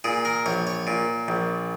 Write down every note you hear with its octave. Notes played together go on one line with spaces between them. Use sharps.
A#2 G#4
A#4
A#1 C#5
C#5
A#2
A#1